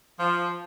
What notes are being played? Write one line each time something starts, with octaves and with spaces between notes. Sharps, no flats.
F3